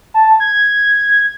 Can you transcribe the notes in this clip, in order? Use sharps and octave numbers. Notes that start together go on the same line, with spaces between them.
A5
G#6